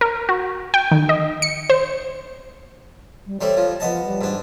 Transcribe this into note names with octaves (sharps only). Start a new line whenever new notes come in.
A#4
F#4
G5
D#3
D#5
C#7
C5
G3
G3 A3 C4 C#5
F3
F3 B3 D#5 A5
G3
G#2 D4